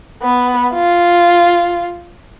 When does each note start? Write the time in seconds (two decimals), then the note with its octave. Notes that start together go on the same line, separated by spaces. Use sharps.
0.23 B3
0.74 F4